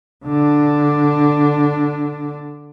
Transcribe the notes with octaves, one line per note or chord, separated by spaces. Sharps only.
D3 D4